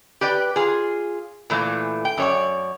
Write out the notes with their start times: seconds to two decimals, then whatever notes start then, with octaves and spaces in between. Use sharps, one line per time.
0.21 G4 B4 D5 G5
0.56 F4 G#4
1.50 A#2 E3 A3
2.05 G5
2.17 F#2 C#5 D5